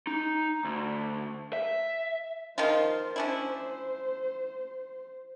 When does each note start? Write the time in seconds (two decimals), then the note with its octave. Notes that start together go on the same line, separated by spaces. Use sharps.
0.07 D#4
0.65 D2
1.53 E5
2.58 D#3 F3 F4 C5
3.16 C#4 D4 E4